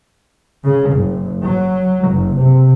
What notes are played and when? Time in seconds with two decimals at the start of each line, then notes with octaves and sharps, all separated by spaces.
0.65 C#3
0.94 F#1
1.43 F#3
2.11 F#1
2.40 C3